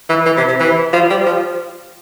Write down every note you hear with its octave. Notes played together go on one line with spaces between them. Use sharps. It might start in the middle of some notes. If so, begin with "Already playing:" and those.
E3
E3
C3
C3
E3
F3
G3
F3